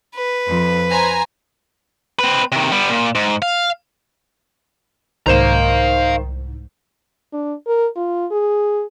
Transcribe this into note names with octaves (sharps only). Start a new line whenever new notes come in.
B4
F2
C5 G#5 A#5
C4 B4
C3 D#3
G3 B3
A#2
G#2
F5
C2 G#2 D#3 C5 F5 A#5 E7
D4
A#4
F4
G#4